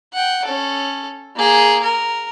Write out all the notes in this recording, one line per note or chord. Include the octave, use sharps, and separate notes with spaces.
F#5 G5
C#4 A4
A#3 G#4
A#4